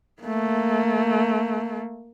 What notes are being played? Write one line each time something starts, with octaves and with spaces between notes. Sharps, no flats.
A3 A#3